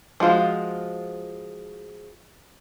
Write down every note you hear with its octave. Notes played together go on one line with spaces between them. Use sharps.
F3 G#3 F4 F#4